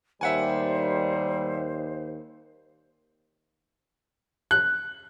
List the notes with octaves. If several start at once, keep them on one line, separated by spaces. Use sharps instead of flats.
D#2 A2 D#3 G3 C5 E5 F#5 G#5
F#6